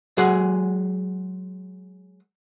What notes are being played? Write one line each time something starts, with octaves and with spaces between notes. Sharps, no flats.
F#3 G#3 G#4 F#5